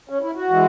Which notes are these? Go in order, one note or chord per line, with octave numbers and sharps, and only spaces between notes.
C#4
E4
F#4
E3 G#3